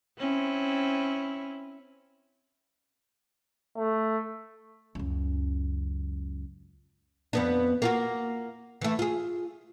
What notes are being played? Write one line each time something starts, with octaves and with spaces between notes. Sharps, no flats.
C4 C#4 E4
A3
C#2 F#2
F2 B3 D4
A#3 F4 F#4
E3 A3
F4 G#4